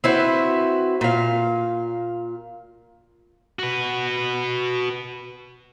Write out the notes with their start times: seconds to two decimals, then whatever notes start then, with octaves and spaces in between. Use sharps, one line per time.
0.04 C4 E4 F#4 B4
1.01 A#2 F5
3.59 F#4 B4